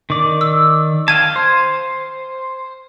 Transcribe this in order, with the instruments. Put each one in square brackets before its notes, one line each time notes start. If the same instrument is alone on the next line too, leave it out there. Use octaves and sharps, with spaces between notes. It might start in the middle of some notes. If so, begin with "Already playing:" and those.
[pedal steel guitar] D#3 D5
[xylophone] E6
[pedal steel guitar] F5 G5 A5 [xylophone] G#6 D#7
[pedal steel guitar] C5